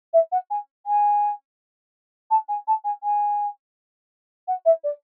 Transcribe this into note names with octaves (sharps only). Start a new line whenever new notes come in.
E5
F#5
G#5
G#5
A5
G#5
A5
G#5
G#5
F#5
E5
D5